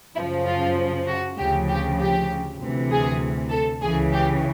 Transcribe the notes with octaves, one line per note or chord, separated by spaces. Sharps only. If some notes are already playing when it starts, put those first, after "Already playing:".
F#2 C#3 F3 E4
F4
F#4
D2 C#3 F3 G4
G4
G4
D2 C3 E3
G#4
A4
C#2 C#3 E3 G#4
G4